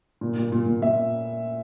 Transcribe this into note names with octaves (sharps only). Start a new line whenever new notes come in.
A#2
A#2
A#2
A#2
A#2 E5